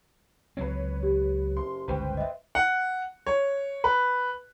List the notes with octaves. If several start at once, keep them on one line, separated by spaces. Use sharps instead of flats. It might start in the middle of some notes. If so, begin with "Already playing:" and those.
C#2 F#3 C4 B4 C#5
G4
F#1 C6
G1 C#2 G2 B4 C5 G5
D#5 E5
F#5
C#5
B4